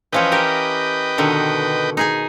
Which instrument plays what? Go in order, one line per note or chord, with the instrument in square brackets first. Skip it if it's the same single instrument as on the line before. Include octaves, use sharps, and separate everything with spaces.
[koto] E3 F3 C#4 [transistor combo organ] B4 D#5 G5
[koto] G4 A#4
B2 D3 D#3
D#4 G#4 G#5